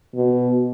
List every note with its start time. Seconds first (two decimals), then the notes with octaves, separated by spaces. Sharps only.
0.15 B2